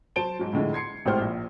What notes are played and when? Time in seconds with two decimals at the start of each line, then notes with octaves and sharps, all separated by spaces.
0.16 F#3 C5 A5 D7 G7
0.39 G#2 F#3
0.53 F2 A2 D3 G#3
0.73 C6 G#6 C7 C#7
1.06 G#1 A2 G4 C5 F6
1.21 A#1